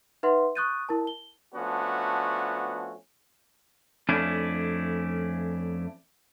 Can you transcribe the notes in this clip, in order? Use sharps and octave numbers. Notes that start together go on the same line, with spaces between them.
D#4 B4 E5 F#5 C6
C#6 D#6 F#6 G6 A6 D#7
E4 A#4 A5
G7
F3 A3 B3 C#4 D4 F#4
F2 A3 C#4 D4 E4